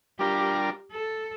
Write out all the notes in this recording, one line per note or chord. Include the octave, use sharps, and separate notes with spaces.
G3 D4 F4 G4 A#4
A4